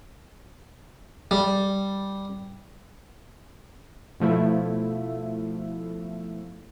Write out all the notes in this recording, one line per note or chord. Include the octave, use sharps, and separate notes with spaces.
G3
B2 F3 A3 E4